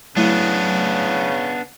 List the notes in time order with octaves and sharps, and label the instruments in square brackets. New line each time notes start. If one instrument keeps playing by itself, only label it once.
[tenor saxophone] C#3 [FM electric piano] F#3 A3 E4 [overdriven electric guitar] B3 D4